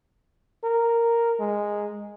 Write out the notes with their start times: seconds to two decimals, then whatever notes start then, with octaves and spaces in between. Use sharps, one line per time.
0.64 A#4
1.39 G#3